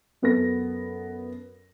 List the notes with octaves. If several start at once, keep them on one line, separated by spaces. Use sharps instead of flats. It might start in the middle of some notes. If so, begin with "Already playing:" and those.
F#2 B3 A4 A#6